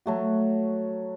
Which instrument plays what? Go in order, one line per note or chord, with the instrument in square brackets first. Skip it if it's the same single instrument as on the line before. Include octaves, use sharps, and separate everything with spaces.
[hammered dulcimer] F#3 A3 F#4